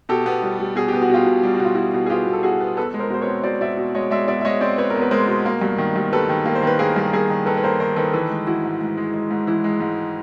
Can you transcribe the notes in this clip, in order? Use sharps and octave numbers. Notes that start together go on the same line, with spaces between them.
B2 G4 A4
B3
G3
G3
B2 G#4
B3 G4
F#4
B2 F4 G4
B2
G3 G4
F#4
B2
F4
B2 E4 F#4
B2
G#4
B3 F4 G4
B2
A4
B2 F#4 G#4
B3
E2 A4 B4
G#3
A#4 C5
B2 C5
B4 C#5
C4
B2 C5 D5
B2 D5 E5
B2
G#3 C#5 D#5
G#3 D5 E5
B2 D5 E5
E5
G#3 C#5 D#5
C4 C5 D5
C4 B4 C#5
A#4
E2
B4
G#3 A#4 C5
B2
A#3
G2
D#3
G2
G3 A4 B4
D#3
A#3
C5
D#3 B4
A#3 G#4 A#4
G2
G2 G#4 A#4
D#3
D#3 A4 B4
B4
A#3 A#4 C5
D#3 A#4 C5
D#3 A4 B4
E3 A4 B4
G#3
E3 E4 F#4
G#2
G#2
G#3
G#3
G#2
E3 E4
G#3
G#2